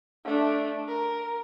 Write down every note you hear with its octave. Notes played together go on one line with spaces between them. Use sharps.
A3 D4
A#4